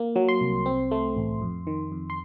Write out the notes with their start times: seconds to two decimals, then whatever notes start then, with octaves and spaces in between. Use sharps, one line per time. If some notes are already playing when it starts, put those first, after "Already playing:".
Already playing: A#3
0.16 F#3
0.29 C6
0.41 C2
0.66 C4
0.91 A3
1.16 A1
1.42 F2
1.67 D#3
1.92 F2
2.10 C6